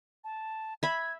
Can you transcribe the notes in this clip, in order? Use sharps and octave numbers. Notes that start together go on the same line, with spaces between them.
A5
E5 B5 G#6